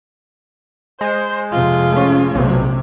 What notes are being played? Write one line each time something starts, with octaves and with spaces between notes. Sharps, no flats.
G#3 C5
F2 C3 F4
A3 C#4
B1 C3